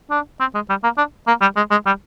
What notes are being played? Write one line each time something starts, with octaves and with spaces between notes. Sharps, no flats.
D4
C4
G#3
G3
A#3
D4
A#3
G3
G#3
G#3
G3